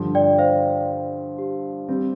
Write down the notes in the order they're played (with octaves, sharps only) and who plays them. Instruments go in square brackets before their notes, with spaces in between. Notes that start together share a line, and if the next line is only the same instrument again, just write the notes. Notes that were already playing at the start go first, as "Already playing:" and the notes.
Already playing: [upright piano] G2 D3 F3
[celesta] D5 G5
C5 F5
G4
[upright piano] G3 C4